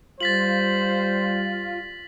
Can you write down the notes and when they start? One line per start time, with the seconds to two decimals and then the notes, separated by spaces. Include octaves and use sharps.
0.20 G3 F4 C5 A6 B6 F#7